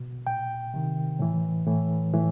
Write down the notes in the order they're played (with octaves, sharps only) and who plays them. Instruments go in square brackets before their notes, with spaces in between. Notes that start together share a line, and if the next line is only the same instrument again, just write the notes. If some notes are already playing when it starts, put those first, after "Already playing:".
Already playing: [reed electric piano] B2
A#2 G5
C3 D#3
A2 E3
A2 E3
A2 E3